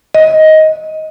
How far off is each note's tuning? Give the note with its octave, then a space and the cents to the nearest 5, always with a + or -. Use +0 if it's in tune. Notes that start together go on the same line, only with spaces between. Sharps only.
D#5 +10